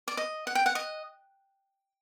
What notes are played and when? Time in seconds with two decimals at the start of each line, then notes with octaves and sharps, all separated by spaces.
0.08 D5
0.17 D#5
0.47 F#5
0.55 G5
0.66 F#5
0.75 D#5